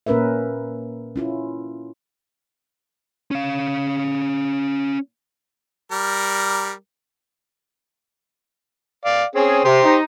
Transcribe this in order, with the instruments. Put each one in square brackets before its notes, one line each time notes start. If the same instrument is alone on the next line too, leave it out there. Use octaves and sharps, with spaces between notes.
[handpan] A#2 A#3 C#4 A#4 B4 E5
C#4 E4 F4
[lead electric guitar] C#4 F5
[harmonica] G3 A#4
D5 F5
[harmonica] C4 C#4 [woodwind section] G#4
[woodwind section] C3 [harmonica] G4 C5
[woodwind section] D#4